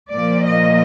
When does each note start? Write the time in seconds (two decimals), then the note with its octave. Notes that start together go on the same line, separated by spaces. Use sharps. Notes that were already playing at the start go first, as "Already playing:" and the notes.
0.11 A#2 F3 A#3 D5
0.47 D#5